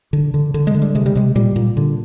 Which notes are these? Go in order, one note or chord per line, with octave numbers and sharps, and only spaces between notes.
D3
D3
D3
G#3
D3
G3
C3 G#3
G3
C3 G#3
A#2 G3
A#2
D3